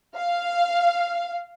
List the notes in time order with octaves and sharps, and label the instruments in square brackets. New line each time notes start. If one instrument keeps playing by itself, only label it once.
[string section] F5